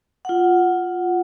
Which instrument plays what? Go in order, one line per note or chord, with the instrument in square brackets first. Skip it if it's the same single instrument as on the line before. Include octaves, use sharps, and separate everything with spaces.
[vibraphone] F4 F#5